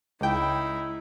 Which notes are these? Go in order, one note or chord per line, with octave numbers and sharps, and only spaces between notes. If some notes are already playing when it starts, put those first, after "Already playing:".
C#2 G#3 D#4 E4 G5